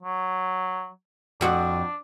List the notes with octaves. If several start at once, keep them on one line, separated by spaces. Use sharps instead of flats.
F#3
F2 D4 F#4